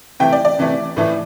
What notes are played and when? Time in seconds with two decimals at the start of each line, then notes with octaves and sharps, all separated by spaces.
0.20 C3 E3 A3 G5
0.33 D5
0.45 D5
0.59 C3 E3 A3
0.96 A2 E3 A3